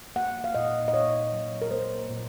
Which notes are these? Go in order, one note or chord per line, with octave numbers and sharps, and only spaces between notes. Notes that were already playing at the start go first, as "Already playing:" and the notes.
A#3 F#5
F5
A#2 D#5
D#5
A#2 C#5
F#3
A#4
A#3 C5
A#2